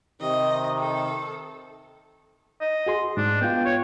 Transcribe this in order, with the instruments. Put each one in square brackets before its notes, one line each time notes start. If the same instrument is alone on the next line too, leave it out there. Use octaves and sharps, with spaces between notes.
[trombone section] C3 D#3 [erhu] D#5
[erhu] A4
[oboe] D#5
[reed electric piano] F#4 G#4 C6
[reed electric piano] G#2 [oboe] D4
[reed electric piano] B3 F4 [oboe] G5
[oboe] C#5